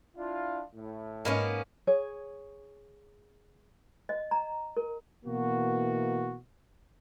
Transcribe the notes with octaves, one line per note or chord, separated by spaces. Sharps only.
D4 E4 F4
A2
G#2 A#3 B3 C#4 D#5
G#4 C#5
D#5
A#5
A#4
B2 E3 A#3 F#4